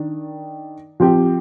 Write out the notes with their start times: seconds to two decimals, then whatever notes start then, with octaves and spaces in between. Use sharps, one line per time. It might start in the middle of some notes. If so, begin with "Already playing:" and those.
Already playing: D#3 D4
1.00 F3 C4 G4